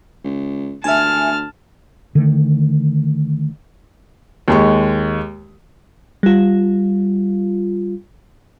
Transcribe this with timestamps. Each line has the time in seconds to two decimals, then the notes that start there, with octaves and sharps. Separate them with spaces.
0.24 C#2
0.84 D2 E5 G#5 A5 F6
2.15 D3 D#3 A3
4.48 D#2 G#3 C#6
6.23 G3 F4